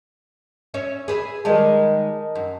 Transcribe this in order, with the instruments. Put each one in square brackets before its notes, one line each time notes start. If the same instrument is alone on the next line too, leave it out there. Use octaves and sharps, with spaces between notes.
[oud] C#4 C#5 E5
G#4 B4 E5
[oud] D#3 G3 G#3 [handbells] A#4 D#5 A5
[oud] F#2